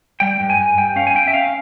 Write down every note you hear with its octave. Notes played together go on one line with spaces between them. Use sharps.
G3 G5
G2
G#5
G2
G2 G5
C#4 F5
G#5
C#4 G5
E5
C#4 F5